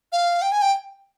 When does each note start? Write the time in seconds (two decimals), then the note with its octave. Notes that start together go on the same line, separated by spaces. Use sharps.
0.12 F5
0.42 G5
0.52 G#5
0.62 G5